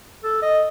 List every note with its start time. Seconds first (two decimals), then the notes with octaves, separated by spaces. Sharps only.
0.24 A4
0.42 D#5